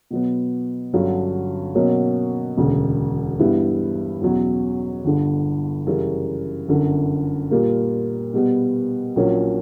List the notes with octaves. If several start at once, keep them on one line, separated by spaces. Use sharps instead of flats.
B2 F#3 B3
G1 G2 D3 F#3 C#4
B2 F#3 A#3 C#4
E1 D2 C#3
G2 E3 G3 B3 E4
E2 B2 F#3 C#4 E4
G1 G2 D3
F#2 C#3 E3 G3
G1 F#2 D3
A#2 G3 A#3
B2 G3 B3
A#1 A#2 F#3 A#3 C#4